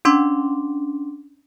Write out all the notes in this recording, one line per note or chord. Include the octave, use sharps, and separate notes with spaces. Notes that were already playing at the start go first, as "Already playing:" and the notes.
C#4 D4 C6 D6